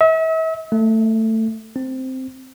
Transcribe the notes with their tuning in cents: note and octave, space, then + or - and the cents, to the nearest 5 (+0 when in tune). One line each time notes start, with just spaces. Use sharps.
E5 -40
A3 +15
C4 -5